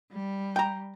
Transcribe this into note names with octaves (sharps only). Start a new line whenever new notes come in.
G3
G5 A#5